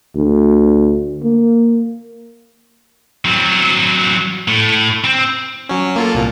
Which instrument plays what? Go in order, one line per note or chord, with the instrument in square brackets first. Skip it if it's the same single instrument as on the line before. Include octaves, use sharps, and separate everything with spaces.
[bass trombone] D2
A#3
[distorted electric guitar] F#3 C4
A2
C4
[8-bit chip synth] F#3 C#4
A#3 F4 A4
C2 A#2